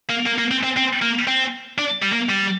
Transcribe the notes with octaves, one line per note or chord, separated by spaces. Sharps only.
A#3
A#3
A#3
C4
C4
C4
A#3
C4
D4
G3
A#3
G3